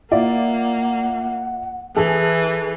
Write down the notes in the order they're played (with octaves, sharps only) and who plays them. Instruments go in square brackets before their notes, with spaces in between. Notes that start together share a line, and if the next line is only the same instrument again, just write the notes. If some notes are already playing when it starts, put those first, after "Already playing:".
[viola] A#3 [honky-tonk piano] E4 F4 D5 [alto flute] F#5
[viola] E3 [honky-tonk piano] G#4 A4